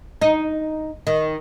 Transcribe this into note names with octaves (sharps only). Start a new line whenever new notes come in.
D#4
D#3